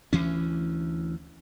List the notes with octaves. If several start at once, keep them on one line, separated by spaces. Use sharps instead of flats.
D2 E3 C#4